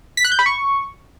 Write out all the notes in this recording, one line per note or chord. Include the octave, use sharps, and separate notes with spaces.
B6
F#6
G6
B5
C#6